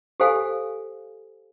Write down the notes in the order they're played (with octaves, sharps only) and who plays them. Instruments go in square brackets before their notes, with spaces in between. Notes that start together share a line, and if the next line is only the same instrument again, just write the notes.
[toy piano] G4 A4 C5 F5 G#5